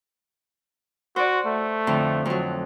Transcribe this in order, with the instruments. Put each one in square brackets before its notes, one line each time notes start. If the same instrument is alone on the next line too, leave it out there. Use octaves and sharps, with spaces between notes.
[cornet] F#4 [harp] C5 D5
[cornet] A3
[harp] F2 A2 D3
F2 F#3